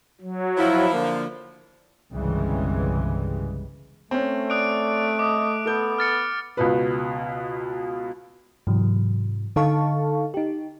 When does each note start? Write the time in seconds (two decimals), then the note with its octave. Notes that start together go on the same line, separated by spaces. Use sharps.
0.21 F#3
0.58 F3 E4
0.93 D3 A#3
2.13 G1 C2 C#3 E3 G3 G#3
4.11 A3 C4 C#4
4.50 D5 D#6 F#6 D7
5.19 D#5 D6
5.66 B3 A4 G6
5.98 F6 A6 C#7
6.57 C#2 B2 B4
8.67 G#2 C3 E3 F#3
9.56 D3 D#4 A4 F5 A5 C#6
10.34 D#4 G4